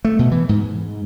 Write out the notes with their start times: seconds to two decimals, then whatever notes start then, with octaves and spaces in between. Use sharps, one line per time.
0.05 A3
0.19 B2
0.31 E3
0.49 G#2